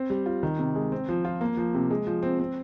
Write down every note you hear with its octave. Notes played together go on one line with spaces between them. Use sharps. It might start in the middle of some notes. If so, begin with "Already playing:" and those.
Already playing: C4
G3
F4
D#3
C3
G#3
C4
F3
F4
A#3
F3
C3
G#3
F3
C4
C4